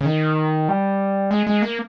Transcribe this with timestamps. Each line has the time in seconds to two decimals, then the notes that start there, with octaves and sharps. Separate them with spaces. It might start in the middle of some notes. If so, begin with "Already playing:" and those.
0.01 C#3
0.06 D#3
0.69 G3
1.31 G#3
1.47 G#3
1.62 A#3